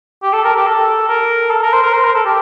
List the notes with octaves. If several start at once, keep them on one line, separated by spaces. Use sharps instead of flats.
G4
A4
A#4
G4
A4
A#4
A4
A#4
C5
A#4
C5
A#4
A4
G4